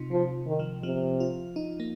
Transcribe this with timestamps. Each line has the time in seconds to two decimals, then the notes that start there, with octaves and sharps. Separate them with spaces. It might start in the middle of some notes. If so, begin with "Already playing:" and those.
Already playing: C3 D#4 F4
0.11 C3 F3
0.47 D#3
0.59 F3
0.83 C3 F3
1.20 F4
1.56 D#4
1.80 A#3